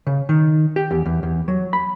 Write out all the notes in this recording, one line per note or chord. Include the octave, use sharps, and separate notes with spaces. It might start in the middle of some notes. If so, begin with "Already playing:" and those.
C#3
D#3
G4
E2
E2
E2
F#3
B5